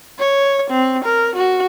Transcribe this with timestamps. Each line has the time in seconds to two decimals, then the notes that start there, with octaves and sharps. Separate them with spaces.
0.19 C#5
0.71 C4
1.05 A#4
1.36 F#4